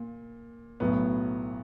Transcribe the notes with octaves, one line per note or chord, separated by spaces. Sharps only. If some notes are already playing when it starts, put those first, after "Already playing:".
Already playing: A#2
B1 A2 F#3 B3